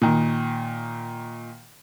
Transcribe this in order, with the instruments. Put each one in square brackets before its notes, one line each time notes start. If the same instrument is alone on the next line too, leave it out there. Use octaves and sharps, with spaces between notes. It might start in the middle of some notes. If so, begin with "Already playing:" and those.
[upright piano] A#2 D#3